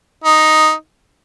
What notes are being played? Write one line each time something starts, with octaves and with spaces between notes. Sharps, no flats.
D#4